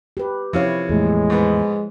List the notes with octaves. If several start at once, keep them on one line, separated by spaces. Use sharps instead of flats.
G4 B4
C3 F3 E4 C#5 F5
E2 A2 G#3
G#2 B3